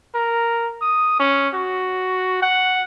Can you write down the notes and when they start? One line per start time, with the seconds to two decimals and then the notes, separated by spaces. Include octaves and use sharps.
0.15 A#4
0.81 D#6
1.20 C#4
1.54 F#4
2.42 F#5